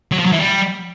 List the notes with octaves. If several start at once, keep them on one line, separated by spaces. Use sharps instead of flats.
F#3
F3
F#3
E3
G3